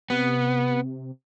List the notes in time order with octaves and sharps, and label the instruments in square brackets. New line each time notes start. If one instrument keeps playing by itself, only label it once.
[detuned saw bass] C3 [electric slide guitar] B3